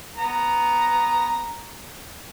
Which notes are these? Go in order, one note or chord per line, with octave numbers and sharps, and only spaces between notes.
B3 A#5